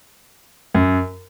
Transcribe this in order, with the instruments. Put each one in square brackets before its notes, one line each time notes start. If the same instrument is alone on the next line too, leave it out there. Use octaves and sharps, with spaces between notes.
[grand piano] F#2